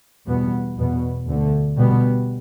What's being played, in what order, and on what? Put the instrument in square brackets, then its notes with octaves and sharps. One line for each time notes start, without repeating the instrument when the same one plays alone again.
[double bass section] E2 B2 G3 B3
E2 B2 B3
D2 D3 A3
B2 G3 B3